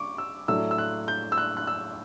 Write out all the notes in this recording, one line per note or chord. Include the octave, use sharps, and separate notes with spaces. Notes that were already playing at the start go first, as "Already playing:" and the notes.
Already playing: C#6 D6
E6
A2 F#3 A3 D4 E6
E6
F#6
G6
E6
F#6
F#6
E6